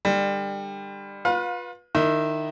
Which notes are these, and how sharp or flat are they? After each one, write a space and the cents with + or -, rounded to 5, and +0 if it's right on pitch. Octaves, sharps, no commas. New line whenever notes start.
D3 +35 G3 +25
F4 +25 B4 -15 F5 +35
D#3 -20 E4 +0